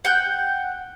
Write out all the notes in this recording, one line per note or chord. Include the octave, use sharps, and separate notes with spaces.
F#5 G5 F#6 G6